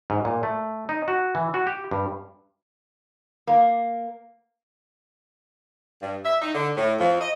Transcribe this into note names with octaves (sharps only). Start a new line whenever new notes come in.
G#2
A#2
A3
D#4
F#4
E3
F#4
G4
G2
A#3
G2
E5
D#4
D3
A2
F2
D#5